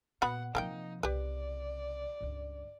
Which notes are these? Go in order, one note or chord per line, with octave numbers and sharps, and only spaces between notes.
A#2 B3 F#4 F#5 B5
C3 F3 A#3 D#4 A#4 G5
C2 C#3 G4 B4 D5
C#2 G2